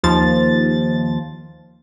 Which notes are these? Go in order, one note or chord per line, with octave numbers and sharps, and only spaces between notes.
D#2 F3 A6